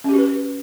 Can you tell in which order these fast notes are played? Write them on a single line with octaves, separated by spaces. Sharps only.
C#4 G4 F#4 B4